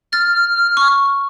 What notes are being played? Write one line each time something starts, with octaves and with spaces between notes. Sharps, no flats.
F6 A6
C#6